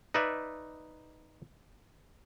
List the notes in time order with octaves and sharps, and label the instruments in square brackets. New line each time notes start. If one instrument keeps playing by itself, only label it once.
[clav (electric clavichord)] D#4 B4 D5 E5